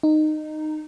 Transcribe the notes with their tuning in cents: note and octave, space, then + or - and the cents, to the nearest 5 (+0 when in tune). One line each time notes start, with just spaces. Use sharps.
D#4 -15